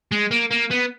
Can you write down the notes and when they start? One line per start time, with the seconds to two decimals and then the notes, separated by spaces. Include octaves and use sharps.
0.12 G#3
0.31 A#3
0.51 A#3
0.71 B3